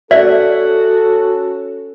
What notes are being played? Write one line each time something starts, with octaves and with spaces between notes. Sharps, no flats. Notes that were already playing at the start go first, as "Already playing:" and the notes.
C#4 F#4 A4 D5 E5